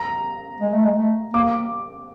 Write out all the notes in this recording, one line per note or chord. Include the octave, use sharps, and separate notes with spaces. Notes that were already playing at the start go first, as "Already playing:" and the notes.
Already playing: A#5
G#3
A3
G#3
A3
A#3 D6